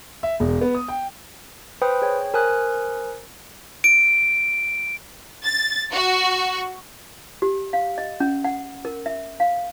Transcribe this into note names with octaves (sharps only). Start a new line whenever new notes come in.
E5
E1
B3
D#6
G5
B4 C5 G5 B5 D#6
G#4 C#5 G5
A#4 C5 G#5 A#5 D#6 F#6
D7
A6
F#4
G4
F5
D#5
C#4
F#5
A#4
E5
F5